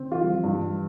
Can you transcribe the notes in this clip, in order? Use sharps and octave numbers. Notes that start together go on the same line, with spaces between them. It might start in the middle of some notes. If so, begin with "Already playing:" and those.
Already playing: D3 C4
E3 F4
G3
F3
G2
G3